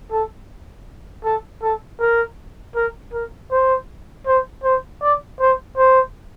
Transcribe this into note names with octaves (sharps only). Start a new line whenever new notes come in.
A4
A4
A4
A#4
A#4
A#4
C5
C5
C5
D5
C5
C5